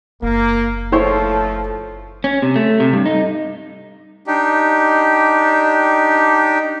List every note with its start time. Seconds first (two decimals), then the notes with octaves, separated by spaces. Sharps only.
0.22 F#1 A#3
0.92 F3 A3 E4 A4 C5 C#5
2.24 C#4
2.42 C3
2.56 A3
2.80 C3
2.93 G2
3.06 D#4
4.27 D4 D#4 G4